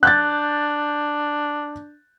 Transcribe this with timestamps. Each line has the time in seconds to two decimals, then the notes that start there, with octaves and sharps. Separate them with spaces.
0.03 D4 F#6 G6 A6